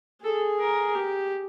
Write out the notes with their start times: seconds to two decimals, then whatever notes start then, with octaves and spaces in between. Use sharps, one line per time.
0.24 G#4 A4
0.60 A#4
0.95 G4